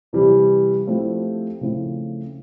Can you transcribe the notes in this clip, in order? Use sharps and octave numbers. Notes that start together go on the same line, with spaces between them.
C3 E3 G3
F3 A3 C4 E4 G4
C#3 F3 A3 C4 E4